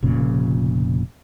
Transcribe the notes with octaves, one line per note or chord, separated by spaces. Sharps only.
F1 F2 A#2 C#3